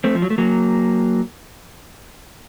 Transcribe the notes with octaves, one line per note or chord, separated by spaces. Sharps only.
A3 C4
F3
F#3
A3
F#3 A#3